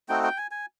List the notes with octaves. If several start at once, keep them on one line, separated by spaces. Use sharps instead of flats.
A3 C4 D#4 F#4 G5
G5
G#5
G#5